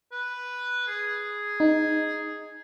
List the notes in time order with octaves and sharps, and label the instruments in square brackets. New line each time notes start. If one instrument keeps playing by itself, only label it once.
[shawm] B4
G#4
[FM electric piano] D#4